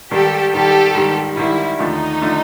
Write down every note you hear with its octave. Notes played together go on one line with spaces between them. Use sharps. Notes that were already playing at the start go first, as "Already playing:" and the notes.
G#2 D#3 G3 G4 A4
G#2 D#3 G3 G4 A4
G#2 D#3 G3
G#2 D#3 G3 E4
D#2 D3 F3 A3 D#4
D3 F3 A3